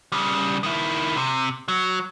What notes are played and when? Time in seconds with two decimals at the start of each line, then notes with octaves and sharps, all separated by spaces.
0.12 C#3 G3
0.63 D#3 E4
1.17 C3
1.68 F#3